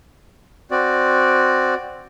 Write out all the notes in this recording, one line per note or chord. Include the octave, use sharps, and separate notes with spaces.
C4 F#4 D5